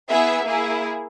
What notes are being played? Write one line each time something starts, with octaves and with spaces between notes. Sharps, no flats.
B3 E4 G#4 E5
A#3 E4 G#4